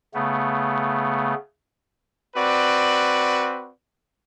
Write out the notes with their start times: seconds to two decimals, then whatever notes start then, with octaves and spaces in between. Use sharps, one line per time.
0.14 C#3 A3 B3
2.36 C4 F#4 B4 D5